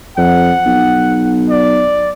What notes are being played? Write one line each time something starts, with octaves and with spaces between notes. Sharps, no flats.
F2 F#5
B1
D5